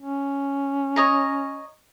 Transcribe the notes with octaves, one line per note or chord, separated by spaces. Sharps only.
C#4
C#5 D#5 A#5